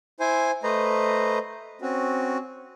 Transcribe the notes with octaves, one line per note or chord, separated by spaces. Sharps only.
E4 C5 G#5
A3 B4 C5 D#5 A#5
C4 C#4 F#4